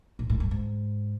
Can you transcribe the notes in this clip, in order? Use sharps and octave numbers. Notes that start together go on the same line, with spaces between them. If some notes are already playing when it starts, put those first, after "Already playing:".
A#2
A2
G2
G#2